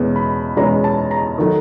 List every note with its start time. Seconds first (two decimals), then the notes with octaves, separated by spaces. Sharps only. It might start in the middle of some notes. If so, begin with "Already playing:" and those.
Already playing: E2 B2 G#3 C#4
0.16 B5
0.57 E2 B2 G#3 C#4 A#5
0.84 A5
1.11 A#5
1.38 D#3 F#3 A3